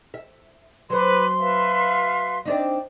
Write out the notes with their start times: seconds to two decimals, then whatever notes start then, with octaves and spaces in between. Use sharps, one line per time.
0.14 E5
0.90 F#3 B4 C5 C6 D6
1.38 B4 E5 F5
2.45 C4 D4 D#4